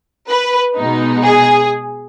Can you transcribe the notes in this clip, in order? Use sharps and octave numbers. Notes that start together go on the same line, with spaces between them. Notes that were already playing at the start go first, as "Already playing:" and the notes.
B4
B2 G#3 B3 D#4
G#4